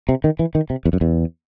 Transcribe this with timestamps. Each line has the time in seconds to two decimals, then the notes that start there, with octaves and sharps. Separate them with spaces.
0.09 C3
0.24 D#3
0.39 E3
0.55 D#3
0.70 C3
0.85 E2
0.93 F#2
1.01 E2